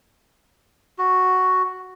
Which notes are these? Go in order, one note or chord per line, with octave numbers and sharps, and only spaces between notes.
F#4